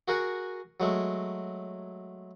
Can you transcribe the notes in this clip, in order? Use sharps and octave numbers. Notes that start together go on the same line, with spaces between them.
F#4 G#4 A#4 F#5 G#5
F#3 G#3 A3